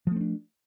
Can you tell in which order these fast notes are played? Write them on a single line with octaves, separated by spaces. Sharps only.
F3 A3 C4 D4